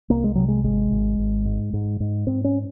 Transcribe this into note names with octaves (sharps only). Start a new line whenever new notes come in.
C2 A#3
G#3
C3 F#3
G#3
G#1 G#3
G#1
G#1
G#2
G#2
G#2
G#2 C4
C#4